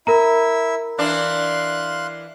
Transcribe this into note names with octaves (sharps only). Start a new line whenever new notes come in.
E4 A#4 E5 A#5
E3 D4 F5 C6 F#6